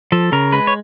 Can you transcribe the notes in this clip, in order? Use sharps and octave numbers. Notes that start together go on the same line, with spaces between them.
F3 A4
C#3 A#4
G#3 B4
C#5